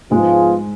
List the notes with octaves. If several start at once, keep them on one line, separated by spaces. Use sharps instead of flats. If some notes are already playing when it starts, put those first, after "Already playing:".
G#2 F3 G#3 B3 F4 G#4